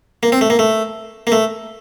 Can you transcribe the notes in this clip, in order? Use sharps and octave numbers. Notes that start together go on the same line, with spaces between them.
A#3
C4
A3
A#3
A3
A#3
A3